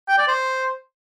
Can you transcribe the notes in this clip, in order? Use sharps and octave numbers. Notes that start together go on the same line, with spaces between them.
G5
D5
C5